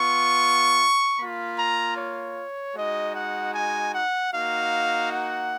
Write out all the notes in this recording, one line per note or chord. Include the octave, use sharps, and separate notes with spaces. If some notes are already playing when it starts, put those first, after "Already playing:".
Already playing: B3 F4 C#6
A#3 F4 B5
A#5
C#5
G#3 D#4 F#4 D#5
F#5
G#5
F#5
A#3 D#4 F#4 F5
F#5